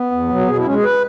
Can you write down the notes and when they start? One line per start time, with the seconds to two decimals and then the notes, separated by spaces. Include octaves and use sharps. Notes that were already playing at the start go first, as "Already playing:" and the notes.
Already playing: B3
0.12 E2
0.29 B2 F#3
0.47 B2 G#4
0.57 E4
0.65 G#3 C#4
0.75 G#4
0.84 B4